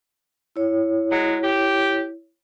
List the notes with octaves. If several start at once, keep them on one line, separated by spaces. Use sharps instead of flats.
E4 C#5
F#3 G#3
G4